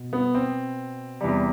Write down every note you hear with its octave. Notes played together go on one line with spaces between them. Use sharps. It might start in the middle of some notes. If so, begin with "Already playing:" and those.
Already playing: B2
B3
C4
E2 C3 G3